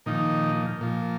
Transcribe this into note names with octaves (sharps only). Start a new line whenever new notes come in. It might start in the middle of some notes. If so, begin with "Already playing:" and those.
A#2 D#3 F3 D#4
A#2 F3